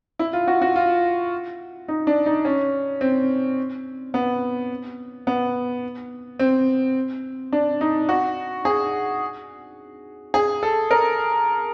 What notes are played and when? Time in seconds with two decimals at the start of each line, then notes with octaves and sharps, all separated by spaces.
0.19 E4
0.33 F4
0.48 F#4
0.62 F#4
0.76 F4
1.88 D#4
2.07 D4
2.26 D#4
2.45 C#4
3.01 C4
4.14 B3
5.27 B3
6.39 C4
7.53 D4
7.81 D#4
8.09 F#4
8.65 G#4
10.34 G#4
10.63 A4
10.91 A#4